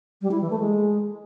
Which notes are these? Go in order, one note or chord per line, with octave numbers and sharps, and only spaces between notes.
G3
E4
E3
A3
G#3